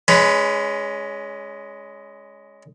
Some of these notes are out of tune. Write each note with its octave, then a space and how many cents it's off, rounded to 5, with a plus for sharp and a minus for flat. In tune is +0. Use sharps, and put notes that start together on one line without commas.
G#3 +0 C#4 +20 B4 +15